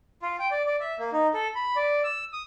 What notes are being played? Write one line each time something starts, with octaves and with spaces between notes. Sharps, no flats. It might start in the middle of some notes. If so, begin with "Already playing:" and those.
F4
G5
D5
D5
E5
A#3
D#4
A4
B5
D5
E6
D#6